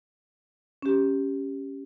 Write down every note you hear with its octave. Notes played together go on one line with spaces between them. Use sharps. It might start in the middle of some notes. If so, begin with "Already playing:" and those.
C#4 G4